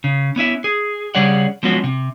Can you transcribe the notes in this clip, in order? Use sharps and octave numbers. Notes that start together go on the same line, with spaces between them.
C#3
B3 C#4 E4 E5
G#4
C#3 G3 G#4 C#5 D5 F#5
F3 F#3 G#3 B3 C#4 F#4
C3